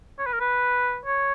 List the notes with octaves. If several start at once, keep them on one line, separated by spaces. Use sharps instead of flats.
C#5
B4
A#4
B4
C#5